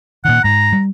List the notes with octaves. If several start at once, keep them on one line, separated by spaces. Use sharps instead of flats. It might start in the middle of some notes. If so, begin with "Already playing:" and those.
A#2 D#3 F#5
G#2 A#5
G3